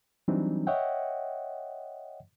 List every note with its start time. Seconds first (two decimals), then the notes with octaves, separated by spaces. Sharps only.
0.28 E3 F#3 G3 C4 D4 D#4
0.67 C#5 D#5 E5 F#5 G5